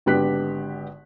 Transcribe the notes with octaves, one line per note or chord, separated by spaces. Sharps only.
G#1 D3 B3 G4 F#6 B6